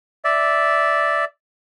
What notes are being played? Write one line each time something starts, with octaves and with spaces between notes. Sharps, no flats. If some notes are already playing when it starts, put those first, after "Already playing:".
D5 E5